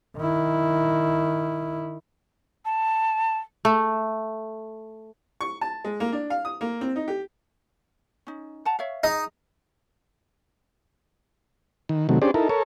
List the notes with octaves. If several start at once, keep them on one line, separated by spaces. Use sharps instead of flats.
D#3 E4
A5
A3
C#6
A5
G#3
A#3
D4
F5
D#6
A#3
C4
D#4
G4
C#4 D#4
F#5 A5 A#5
C#5 E5 F5
D#4 G#4 D#5 A#5
D#3
C3 D#3 F#3 A3
C#4 D4 G4 G#4 C5 D5
D#4 E4 A4 A#4
A4 A#4 C#5